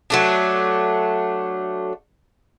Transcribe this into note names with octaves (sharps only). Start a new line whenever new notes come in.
F#3 A3 D4